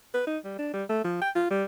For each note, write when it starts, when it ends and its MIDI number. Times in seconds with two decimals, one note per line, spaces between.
0.14 0.24 71
0.27 0.38 63
0.45 0.58 55
0.59 0.71 62
0.74 0.84 55
0.89 1.03 57
1.04 1.19 53
1.22 1.30 79
1.35 1.48 65
1.51 1.64 55